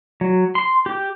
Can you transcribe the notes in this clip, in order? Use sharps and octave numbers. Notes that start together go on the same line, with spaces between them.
F#3
C6
G4